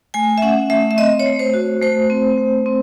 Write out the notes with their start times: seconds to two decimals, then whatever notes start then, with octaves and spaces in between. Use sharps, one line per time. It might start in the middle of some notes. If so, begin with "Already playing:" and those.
0.14 A3 G#5
0.38 E5
0.42 C#4 F#5
0.70 A3 E5
0.91 E5
0.98 C4 D#5
1.20 C#5
1.26 A3
1.39 C5
1.54 F#4
1.82 A3 C5
2.10 C4
2.38 A3
2.66 C4